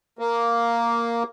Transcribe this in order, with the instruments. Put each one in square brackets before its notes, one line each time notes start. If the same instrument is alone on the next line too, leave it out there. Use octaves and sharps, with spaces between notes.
[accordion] A#3